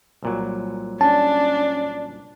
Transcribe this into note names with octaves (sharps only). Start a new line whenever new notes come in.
C2 A#2 F#3
C#4 D4 A5